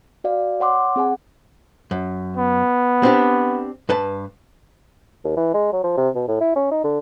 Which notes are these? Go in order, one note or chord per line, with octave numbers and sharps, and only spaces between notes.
F#4 D5 F5
C#5 F#5 C6 D6
C4 G#4 F#5 G#5
F#2
B3
C4 D4 G4
G2 B4 A5
D#2
E3
G#3
F#3
F3
C3
B2
A2
E4
C#4
D#4
D3